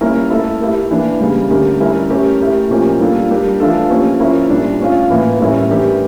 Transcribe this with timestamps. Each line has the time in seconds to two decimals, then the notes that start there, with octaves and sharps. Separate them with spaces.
0.01 G3 A#3 C#4 E4 A#4
0.31 A3 E4 A4
0.61 A3 E4 G4 A#4
0.90 E3 A#3 D4
1.20 C#3 G3 A#3
1.50 D3 A3 C#4 G4 A#4
1.80 G3 C#4 E4 A#4
2.10 A3 C#4 G4 A#4
2.40 A3 E4 G4 A#4
2.70 A#2 F3 C#4 G4 A#4
3.00 G3 A#3 D4 F4 A4
3.30 G3 D4 G4 A#4
3.60 E3 A3 D4 F4 A4
3.90 F3 A#3 C#4 G4
4.19 F3 C#4 E4 A#4
4.50 A#2 G3 D4
4.79 A3 C#4 F4
5.09 A2 E3 A#3
5.39 A2 G3 C#4 E4 A#4
5.70 E3 A3 D4 G4 A#4